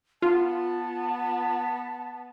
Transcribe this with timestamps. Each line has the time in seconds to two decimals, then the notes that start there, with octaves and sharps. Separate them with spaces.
0.22 B3 F4 A5